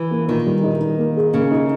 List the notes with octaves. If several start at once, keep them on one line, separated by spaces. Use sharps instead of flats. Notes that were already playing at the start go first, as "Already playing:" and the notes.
Already playing: E3
A#3
A#2 D#3
G3
D#4
D#4
A#3
G#4
C#3 A#3
D#4